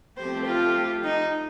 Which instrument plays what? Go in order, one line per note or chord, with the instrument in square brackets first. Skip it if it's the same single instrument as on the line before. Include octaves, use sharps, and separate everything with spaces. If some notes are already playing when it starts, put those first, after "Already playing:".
[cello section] F3 A3 C4 G4 [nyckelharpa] C5
[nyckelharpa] F4
D#4